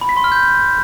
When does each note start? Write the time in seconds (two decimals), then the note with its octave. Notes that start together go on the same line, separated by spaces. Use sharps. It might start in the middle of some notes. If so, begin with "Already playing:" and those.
0.01 B5
0.09 B6
0.17 C6
0.24 F6
0.32 G6